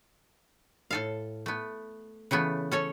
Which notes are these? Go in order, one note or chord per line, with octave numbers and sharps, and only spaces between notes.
A2 A4 F5
A3 B3
C#3 E3 A3 B3
C#4 A4 C#5